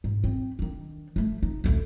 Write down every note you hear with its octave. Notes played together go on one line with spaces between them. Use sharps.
G#2
C4
D#3 D4
F3 A3
D#4
A1 D2